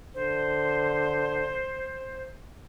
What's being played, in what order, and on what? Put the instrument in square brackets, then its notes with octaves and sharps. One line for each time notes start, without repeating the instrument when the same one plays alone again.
[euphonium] D3 [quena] C5